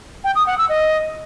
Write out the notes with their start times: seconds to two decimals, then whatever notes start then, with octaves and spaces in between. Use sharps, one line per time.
0.24 G5
0.35 D#6
0.47 F#5
0.58 E6
0.69 D#5